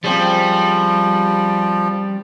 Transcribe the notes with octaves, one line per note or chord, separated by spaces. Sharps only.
F3 G3 C4 C#4 G#4